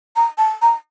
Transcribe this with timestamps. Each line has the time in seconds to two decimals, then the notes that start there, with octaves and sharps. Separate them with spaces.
0.16 A#5
0.38 A5
0.62 A#5